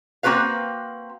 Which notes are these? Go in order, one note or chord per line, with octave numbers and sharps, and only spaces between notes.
A#3 C4 F#4 B4 F5